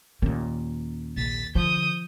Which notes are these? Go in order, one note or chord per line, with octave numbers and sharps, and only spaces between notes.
D#2 A#2 C#4
A#1 A6 B6
D3 F3 D#6 G6